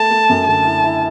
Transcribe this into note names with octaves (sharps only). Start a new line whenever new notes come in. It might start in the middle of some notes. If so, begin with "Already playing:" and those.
Already playing: A3 A5
A3
F#2
D3 A5
E4
E4